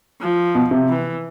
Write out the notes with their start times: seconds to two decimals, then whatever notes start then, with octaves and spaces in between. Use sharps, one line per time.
0.21 F3
0.55 B2
0.71 C3
0.89 E3